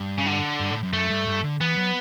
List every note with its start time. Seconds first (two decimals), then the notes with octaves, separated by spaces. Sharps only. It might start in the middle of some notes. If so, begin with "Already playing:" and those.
Already playing: G2
0.18 C#3
0.26 D3
0.60 G2
0.71 A2
0.83 F#2
0.93 F#2 A3
1.10 G2
1.27 G2
1.44 D3
1.60 E3 B3
1.77 F#3